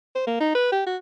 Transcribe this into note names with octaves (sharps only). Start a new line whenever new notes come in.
C5
A#3
D#4
B4
G4
F#4